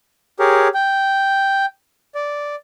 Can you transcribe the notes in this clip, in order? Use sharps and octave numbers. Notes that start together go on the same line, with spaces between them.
G4 G#4 A#4 C#5
G5
D5